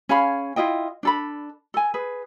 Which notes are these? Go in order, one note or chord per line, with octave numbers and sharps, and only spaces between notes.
C#4 G#4 F5 B5
E4 F4 D#5 G5
D4 A4 B5
A4 G#5
G#4 B4